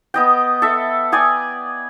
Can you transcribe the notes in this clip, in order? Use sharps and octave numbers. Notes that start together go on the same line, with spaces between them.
B3 D#5 G5
A4 E5
D5 G5 G#5 D#6